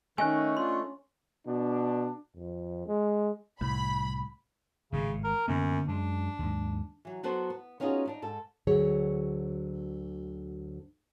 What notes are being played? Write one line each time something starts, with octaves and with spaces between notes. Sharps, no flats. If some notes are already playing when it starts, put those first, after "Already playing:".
D#3 A3 C#4 D#5 G#5 F#6
D4 F4 C6
B2 D4
F2
G#3
C2 A2 B5
G#1 A2 C#3
A#4
F#2 D3 A#3 B3
F#2 G#3 D4
D#2 G#2
E3 F#3
F#3 B3 F#4 A4 C5
B3
B3 C#4 D#4 F4 F#4 G#4
B3 D4 D#4
G#2 A4
D2 D3 F#3 G#4 C#5